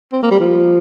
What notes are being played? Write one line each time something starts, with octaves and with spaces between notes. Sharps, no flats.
C4
A#3
G3
F3